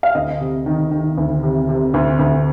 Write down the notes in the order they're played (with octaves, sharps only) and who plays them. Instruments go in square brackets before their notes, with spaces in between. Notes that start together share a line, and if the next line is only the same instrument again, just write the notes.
[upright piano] F5
D2 D#5
C3
D#3
D#3
D2
C3
C3
D2
D2